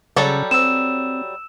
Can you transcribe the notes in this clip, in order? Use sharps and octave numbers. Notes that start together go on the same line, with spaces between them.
C#3 F#3 G3 A4
C4 E6 E7